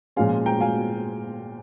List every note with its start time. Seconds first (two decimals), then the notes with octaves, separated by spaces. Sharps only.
0.16 A#2 F3 G#3 C#4 F5 G#5
0.46 G5 A#5
0.60 F5 G#5